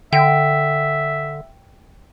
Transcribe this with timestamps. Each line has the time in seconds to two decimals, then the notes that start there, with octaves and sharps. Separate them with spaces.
0.13 D3 E5 G5